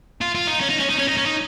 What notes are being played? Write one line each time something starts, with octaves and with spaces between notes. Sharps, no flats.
F4
F4
D#4
C#4
D#4
C#4
D#4
C#4
D#4
C#4
D#4